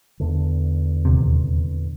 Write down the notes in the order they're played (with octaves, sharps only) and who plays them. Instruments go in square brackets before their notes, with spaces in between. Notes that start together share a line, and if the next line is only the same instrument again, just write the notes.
[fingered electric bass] E2 D3
[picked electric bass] D#1 C3